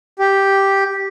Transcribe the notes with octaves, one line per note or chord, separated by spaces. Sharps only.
G4